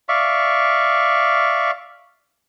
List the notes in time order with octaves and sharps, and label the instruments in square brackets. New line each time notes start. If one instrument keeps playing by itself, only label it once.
[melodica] D5 E5 F5 C#6